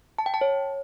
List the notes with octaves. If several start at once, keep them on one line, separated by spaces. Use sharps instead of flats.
A5
G5
A5
C#5